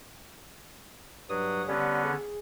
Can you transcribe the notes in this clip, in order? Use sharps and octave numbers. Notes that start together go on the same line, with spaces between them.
G2 F#3 D#6
D3 G3 B3 C#4
G#4